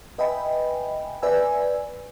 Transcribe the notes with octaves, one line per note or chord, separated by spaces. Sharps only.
B4 D#5 E5 G5 G#5 B5
B4 D5 E5 G#5 E6